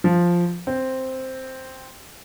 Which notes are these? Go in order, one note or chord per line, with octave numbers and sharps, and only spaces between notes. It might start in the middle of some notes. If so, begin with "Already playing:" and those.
F3
C4